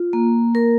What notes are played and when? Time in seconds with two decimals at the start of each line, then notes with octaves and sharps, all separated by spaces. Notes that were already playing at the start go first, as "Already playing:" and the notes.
Already playing: F4
0.13 A#3
0.55 A#4